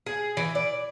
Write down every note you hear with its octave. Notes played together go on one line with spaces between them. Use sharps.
G#4
E3
D5